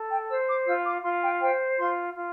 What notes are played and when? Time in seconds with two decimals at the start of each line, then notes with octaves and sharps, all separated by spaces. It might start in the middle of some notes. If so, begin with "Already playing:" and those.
Already playing: A4
0.10 G5
0.28 C5 E6
0.47 D6
0.65 F4 E6
0.84 D6
1.02 F4 C6
1.21 G5
1.40 C5 G5
1.77 F4 C6
2.15 F4